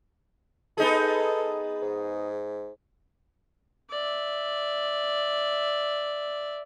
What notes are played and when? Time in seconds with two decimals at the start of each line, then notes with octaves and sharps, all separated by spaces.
0.78 B3 D#4 G#4 A4
1.82 G#2
3.90 D5 E5